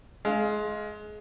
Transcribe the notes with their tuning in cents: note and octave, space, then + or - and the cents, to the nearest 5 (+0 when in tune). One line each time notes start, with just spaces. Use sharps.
G#3 +25 F5 +0